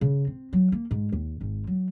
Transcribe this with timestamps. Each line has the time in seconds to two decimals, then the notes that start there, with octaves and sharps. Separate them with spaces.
0.01 C#3
0.27 C4
0.53 F#3
0.72 A#3
0.91 G#2
1.12 D#2
1.41 G#1
1.67 F#3